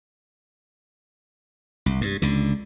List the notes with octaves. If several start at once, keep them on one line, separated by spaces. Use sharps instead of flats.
C2
G2
C#2 D3